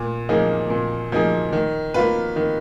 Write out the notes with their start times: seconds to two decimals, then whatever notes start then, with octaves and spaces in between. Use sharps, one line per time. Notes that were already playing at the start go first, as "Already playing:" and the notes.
Already playing: A#2
0.29 F3 A#3 D#4 G#4
0.70 A#2
1.12 F3 A#3 D#4 G#4
1.53 D#3
1.94 A#3 F4 B4
2.36 D#3